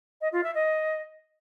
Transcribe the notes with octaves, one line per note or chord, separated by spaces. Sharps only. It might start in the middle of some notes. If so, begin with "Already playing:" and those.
D#5
F4
E5
D#5